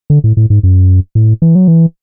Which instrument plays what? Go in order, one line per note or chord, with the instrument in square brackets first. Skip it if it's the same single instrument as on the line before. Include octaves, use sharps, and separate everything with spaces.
[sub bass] D3
A2
A2
G#2
F#2
A2
E3
F#3
E3